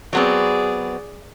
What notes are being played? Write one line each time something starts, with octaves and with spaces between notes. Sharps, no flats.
F#3 B3 C4 G#4 D5